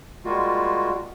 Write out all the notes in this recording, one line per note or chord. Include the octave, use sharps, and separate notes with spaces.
G3 G#3 A#3 F4 F#4